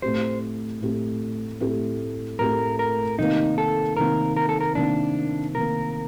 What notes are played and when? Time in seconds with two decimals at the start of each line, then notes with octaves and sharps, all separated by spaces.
0.02 A2 A3 C4 G4 C5
0.81 A2 A3 C4 G4
1.60 A2 A3 C4 G4
2.39 A2 A3 C4 G4 A#4
2.79 A#4
3.18 C3 D#3 A#3 D#4
3.58 A4
3.97 C3 D#3 A#3 A#4
4.37 A#4
4.49 A4
4.61 A#4
4.75 C3 D#3 A#3 D4
5.55 C3 D#3 A#3 A#4